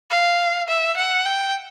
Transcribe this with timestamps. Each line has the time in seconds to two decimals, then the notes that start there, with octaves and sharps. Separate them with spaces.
0.11 F5
0.68 E5
0.96 F#5
1.26 G5